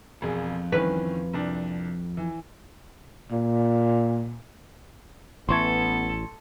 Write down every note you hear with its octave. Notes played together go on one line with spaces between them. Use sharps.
E1 F2 G#4
D#3 E3 C#4 B4
C2 D4
E3
A#2
A1 E3 B3 A4 C6 C#6 G#6